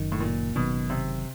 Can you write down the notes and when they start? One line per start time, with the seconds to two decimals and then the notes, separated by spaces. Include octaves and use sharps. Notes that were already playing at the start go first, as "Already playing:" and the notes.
Already playing: F#1 F#2 D#3
0.12 A2
0.20 A#2
0.55 F#1 F#2 B2 D#3
0.90 C3